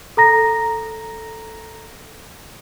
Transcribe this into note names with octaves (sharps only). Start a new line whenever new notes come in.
A4 A#5 A#6